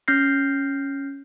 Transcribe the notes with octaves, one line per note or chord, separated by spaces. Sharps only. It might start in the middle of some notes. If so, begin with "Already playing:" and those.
C#4 F6 G6 A#6 C7